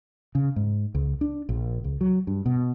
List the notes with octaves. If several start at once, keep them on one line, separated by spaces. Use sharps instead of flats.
C#3
G#2
C#2
D4
A#1
C#2
F#3
G2
B2